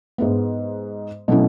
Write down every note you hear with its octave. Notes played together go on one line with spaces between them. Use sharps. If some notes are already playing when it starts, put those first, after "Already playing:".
G#2 G#3 B3
B2 F#3 A3 C#4 E4